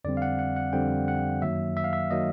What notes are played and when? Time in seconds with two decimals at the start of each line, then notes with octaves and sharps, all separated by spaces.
0.04 F2 D3 G3 C4 D5
0.17 F5
0.22 F#5
0.39 F#5
0.56 F#5
0.73 F2 D3 G3 C4 G5
1.08 F#5
1.42 F#2 D#3 F#3 A#3 E5
1.77 E5
1.84 F5
1.93 E5
2.11 D#3 F#3 A#3 D#5